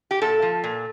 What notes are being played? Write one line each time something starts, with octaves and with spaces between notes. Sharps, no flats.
G4
A#2 A4
F3
A#2